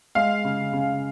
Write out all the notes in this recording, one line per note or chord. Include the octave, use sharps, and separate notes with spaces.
G#3 F5
C#3
C#3